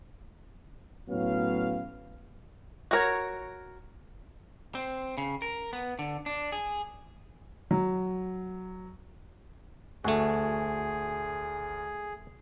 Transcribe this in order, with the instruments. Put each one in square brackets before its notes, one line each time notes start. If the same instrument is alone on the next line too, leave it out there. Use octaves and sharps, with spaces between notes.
[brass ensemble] A2 F#3 B3 C#4 F5
[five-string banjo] F#4 A#4 C#5
[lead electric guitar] C4
C#3
A#4
B3
D3
D4
G#4
[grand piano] F#3
[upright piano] D2 [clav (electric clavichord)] A3 F#4 [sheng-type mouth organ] G#4